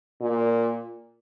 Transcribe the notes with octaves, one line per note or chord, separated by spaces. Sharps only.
A#2